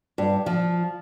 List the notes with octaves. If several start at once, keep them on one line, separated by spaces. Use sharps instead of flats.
G2
F3